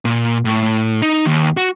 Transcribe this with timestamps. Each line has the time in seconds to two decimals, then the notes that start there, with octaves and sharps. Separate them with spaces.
0.05 A#2
0.45 A2
1.02 D#4
1.26 D#2
1.57 F#4